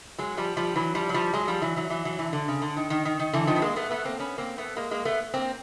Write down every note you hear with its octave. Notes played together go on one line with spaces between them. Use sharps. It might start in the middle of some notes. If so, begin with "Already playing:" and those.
F#3 G#3
F3 G3
F3 G3
E3 F#3
F3 G3
F#3
F3 G3
F#3 G#3
F3 G3
E3 F#3
E3 F#3
E3 F#3
E3 F#3
D3 E3
D3
C#3
D3
D#3
D#3
D#3
D#3
D3 E3
D#3 F3
B3
G#3 A#3
A3 B3
A3 B3
A#3 C4
B3 C#4
A#3 C4
A3 B3
G#3 A#3
G#3 A#3
A3 B3
A#3 C4